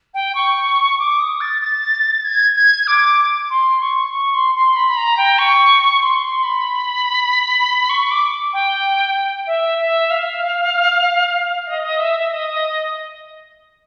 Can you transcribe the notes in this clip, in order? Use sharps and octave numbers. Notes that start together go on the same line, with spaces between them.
G5
C#6
D6
D#6
A6
A6
G#6
G#6
D6
C6
C#6
C#6
C6
C6
B5
B5
A#5
G5
C#6
C6
C6
B5
C#6
D6
G5
E5
E5
F5
D#5
E5
D#5